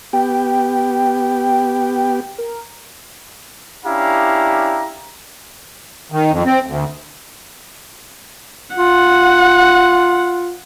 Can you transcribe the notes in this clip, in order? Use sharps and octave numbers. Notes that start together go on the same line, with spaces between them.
B3 G4 G5
A#4
C#4 D4 E4 G4 F5 A#5
D#3
F2
C4
D2
F4 F#5